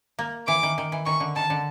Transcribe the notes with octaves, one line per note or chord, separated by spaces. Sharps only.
A#3
E3 D6
D#3
D#3
E3
D#3 C#6
D3
D#3 A5
D3